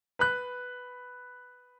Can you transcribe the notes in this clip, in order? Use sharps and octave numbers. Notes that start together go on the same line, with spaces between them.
B4 B5 F#6